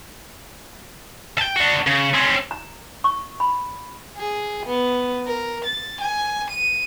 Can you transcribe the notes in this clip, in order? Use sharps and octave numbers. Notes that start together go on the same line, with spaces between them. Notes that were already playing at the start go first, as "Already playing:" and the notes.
G5 A5
D4 F#4
C#3
C4 C#4
A#5
C#6
B5
G#4
B3
A#4
A6
G#5
D#7